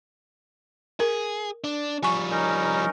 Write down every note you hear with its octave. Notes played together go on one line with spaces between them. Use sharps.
G#4 A#4
D4
F3 G3 G#5 C#6
C#4 D#4 A#4